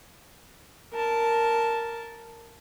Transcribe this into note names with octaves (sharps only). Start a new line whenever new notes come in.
A#4 A5